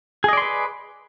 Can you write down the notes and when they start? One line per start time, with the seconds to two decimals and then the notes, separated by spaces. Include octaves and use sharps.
0.24 G#4
0.29 D#5
0.33 D5
0.37 C6
0.42 B4